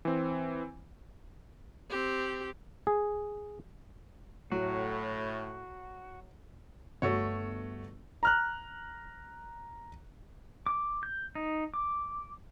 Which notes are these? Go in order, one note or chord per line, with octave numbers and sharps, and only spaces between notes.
E3 C4
C4 G4
G#4
A2 F#3 F#4
G1 A3 F#4 C#5
A#5 F6 F#6
D6
G6
D#4
D6